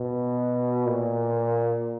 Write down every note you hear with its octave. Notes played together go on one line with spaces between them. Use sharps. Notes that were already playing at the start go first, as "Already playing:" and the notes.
Already playing: B2
A#2